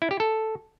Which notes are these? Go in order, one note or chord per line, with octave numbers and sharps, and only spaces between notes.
E4
G4
A4